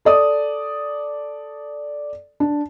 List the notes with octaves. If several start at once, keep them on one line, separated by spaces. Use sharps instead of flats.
A4 D5 D#6
D4